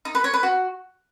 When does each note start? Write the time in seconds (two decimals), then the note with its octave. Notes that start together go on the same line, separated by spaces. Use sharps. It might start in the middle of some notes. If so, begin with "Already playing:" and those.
0.05 D#4
0.15 B4
0.24 C#5
0.34 B4
0.43 F#4